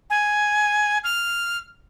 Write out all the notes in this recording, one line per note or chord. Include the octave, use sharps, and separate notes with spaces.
G#5
F6